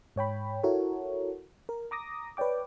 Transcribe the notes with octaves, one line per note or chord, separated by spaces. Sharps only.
G#2 C#5 G5 B5
E4 F#4 A4 A#4 C#5
A#4
A#5 D6 D#6 A#6
B4 C#5 D5 G5 D6